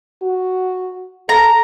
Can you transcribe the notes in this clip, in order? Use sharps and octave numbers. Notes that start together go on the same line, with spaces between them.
F#4
A4 A#5